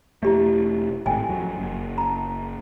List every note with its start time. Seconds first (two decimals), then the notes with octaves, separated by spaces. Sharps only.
0.23 E1 A3 E4 G4 D5
1.06 G#1 A2 G5 G#5
1.29 F2 F#3
1.58 F#1
1.98 A5 A#5